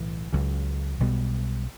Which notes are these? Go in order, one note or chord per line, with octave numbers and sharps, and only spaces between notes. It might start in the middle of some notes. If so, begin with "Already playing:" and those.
Already playing: B1 A2 E3
C#2 C#3 F#3
B1 B2 G3 B3